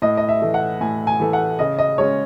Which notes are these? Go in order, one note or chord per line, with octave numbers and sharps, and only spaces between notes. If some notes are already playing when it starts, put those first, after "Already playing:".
A2 D#5
D#5
E5
E3 A3
F#5
A2 G#5
G#5
E3 A3
F#5
C#3 D#5
D#5
G#3 C#4 C#5